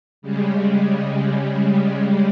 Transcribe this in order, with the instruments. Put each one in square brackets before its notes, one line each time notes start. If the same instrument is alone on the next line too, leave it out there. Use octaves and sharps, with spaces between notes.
[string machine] C#3 G3 G#3